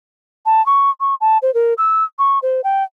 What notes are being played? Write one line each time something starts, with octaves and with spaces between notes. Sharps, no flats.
A5
C#6
C#6
A5
C5
A#4
E6
C#6
C5
G5